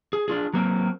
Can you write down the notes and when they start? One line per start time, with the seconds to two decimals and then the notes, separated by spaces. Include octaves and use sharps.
0.13 G#4
0.28 D4 F4 G#4
0.53 F#3 A#3 C4